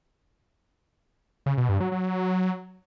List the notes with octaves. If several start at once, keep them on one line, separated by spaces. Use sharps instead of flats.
C#3
B2
G2
F#3
F#3